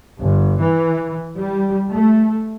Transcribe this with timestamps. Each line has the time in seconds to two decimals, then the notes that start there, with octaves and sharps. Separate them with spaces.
0.20 G1
0.62 E3
1.38 G3
1.92 A3